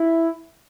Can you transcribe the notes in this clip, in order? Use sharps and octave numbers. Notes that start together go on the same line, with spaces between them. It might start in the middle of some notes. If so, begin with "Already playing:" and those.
Already playing: E4